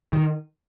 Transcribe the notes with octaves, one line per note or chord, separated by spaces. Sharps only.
D#3